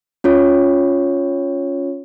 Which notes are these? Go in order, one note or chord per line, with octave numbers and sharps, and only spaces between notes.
C#4 F4 C#5